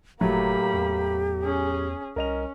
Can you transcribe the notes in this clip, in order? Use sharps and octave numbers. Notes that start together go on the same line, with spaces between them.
F#1 A2 F#3 A3 A#3 G4 B5
E2
C#4 G#4
C2 C#4 A#4 D#5 F7